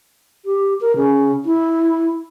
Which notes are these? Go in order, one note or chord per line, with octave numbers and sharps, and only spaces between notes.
G4
A#4
C#3
E4